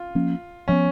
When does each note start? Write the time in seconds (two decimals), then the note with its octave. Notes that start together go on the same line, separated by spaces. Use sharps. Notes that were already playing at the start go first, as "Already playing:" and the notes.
Already playing: F4
0.15 F3 A#3 C#4
0.68 F3 B3 C#4